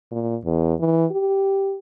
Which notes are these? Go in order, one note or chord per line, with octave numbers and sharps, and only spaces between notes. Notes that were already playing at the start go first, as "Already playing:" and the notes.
A#2
E2
E3
G4